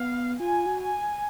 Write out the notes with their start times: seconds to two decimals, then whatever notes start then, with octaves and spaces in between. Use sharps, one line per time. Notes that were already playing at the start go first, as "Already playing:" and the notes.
Already playing: B3 F5
0.39 F4 G#5
0.66 F#4
0.80 G#5